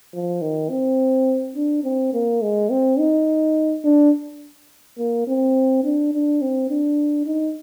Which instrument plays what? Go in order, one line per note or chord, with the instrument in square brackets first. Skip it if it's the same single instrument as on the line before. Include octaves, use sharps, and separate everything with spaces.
[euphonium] F3
D#3
C4
D4
C4
A#3
G#3
C4
D#4
D4
A#3
C4
D4
D4
C4
D4
D#4